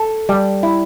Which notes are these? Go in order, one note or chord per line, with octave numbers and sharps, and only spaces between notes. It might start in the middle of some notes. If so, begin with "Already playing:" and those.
Already playing: A4
G3
E4